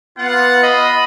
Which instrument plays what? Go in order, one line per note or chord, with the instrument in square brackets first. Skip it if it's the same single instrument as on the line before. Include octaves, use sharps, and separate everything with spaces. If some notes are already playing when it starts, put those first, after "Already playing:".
[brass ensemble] B3 F#5 [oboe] F4
[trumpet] D#5 [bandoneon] B5